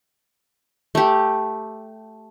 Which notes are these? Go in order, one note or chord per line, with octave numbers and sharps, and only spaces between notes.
A3 G4